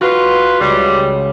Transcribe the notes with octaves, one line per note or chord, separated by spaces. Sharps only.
F4 F#4 B4
C#2 G3